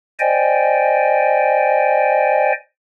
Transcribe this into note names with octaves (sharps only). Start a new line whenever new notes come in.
C5 D5 D#5 G5 G#5